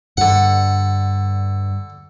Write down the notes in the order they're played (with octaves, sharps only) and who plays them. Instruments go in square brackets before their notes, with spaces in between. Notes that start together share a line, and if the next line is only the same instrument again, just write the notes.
[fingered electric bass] G2 G3 [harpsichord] D3 F#5